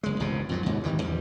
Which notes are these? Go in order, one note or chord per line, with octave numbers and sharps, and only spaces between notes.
F#1 G#3
G#1 C#2 G2 B2
F2 G#2 F#3
D#2 G#2 B2
G#1 D#3 E3 G3
E2 G3